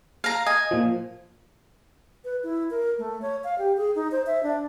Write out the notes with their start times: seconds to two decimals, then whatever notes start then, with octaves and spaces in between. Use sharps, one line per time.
0.24 F5 A#5
0.46 D#5 G#5
0.71 A#2 F3
2.24 B4
2.43 E4
2.70 A#4
2.98 A3
3.22 C#5
3.44 F5
3.58 G4
3.77 G#4
3.95 D#4
4.12 C5
4.26 E5
4.43 D4